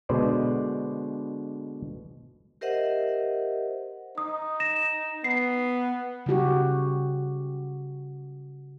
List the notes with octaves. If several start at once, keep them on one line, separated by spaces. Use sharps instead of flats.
B2 D3 G#3 B4 C5 D5
G4 A#4 C5 D#5 E5 F#5
D#4 D#6
A#6 E7
B3 C7
C#3 G3 F#4 G4